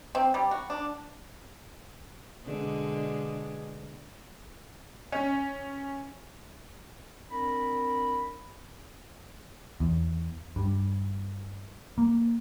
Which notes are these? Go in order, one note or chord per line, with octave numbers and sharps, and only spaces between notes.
C4
G3
F#4
D4
B2 D3 G#3
C#4
C4 D4 A#4 B5
E2
G2
A#3